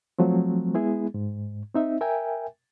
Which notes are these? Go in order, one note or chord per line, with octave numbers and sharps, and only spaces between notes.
F3 F#3 A3 C4
G#3 B3 E4 G#4
G#2
C4 D#4 E5
A#4 E5 G5 G#5